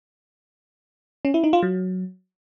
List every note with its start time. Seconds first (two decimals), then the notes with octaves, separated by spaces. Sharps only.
1.25 C#4
1.34 E4
1.44 D#4
1.53 F4
1.63 F#3